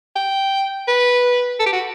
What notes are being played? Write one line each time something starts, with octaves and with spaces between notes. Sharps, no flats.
G5
B4
A4
G4
F#4